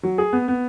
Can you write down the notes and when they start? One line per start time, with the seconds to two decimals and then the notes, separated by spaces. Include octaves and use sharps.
0.03 F#3
0.18 G#4
0.33 B3
0.48 B3